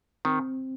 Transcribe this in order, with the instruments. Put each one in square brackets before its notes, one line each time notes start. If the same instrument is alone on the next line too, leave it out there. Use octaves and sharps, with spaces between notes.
[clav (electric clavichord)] D#3 [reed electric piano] C4